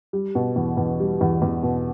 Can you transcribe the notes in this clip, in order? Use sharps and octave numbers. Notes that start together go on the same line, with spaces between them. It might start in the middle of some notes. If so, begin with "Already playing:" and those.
G3
B2
E2
E2
G3
E2
E2
B2